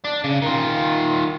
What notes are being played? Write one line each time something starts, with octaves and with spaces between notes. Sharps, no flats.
D4
C#3
D#3 F4